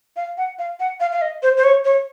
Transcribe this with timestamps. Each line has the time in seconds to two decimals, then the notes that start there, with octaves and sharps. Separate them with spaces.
0.16 F5
0.37 F#5
0.59 F5
0.80 F#5
1.00 F5
1.12 F5
1.22 D#5
1.43 C5
1.57 C5
1.64 C#5
1.85 C#5